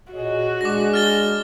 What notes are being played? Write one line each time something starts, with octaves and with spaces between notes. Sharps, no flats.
A#2 F#4 G#4 C#5 D#5
G#3 D4 G#4 D6 A#6
F6 A6 G7